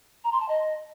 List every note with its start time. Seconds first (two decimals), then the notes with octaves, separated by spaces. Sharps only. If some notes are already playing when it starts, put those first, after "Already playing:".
0.24 A#5
0.32 C6
0.40 A5
0.49 D#5